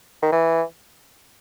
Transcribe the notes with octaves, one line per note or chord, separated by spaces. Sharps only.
D#3
E3